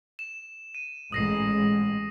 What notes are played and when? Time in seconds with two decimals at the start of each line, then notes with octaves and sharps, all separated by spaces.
0.19 E7
0.75 D#7
1.12 A1 G#3 D#6 A#6 C7